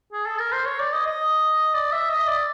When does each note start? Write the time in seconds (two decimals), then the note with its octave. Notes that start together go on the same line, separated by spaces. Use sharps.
0.13 G#4
0.26 A4
0.39 A#4
0.53 C5
0.66 C#5
0.80 D5
0.93 D#5
1.07 D#5
1.74 D5
1.92 E5
2.10 D#5
2.28 D5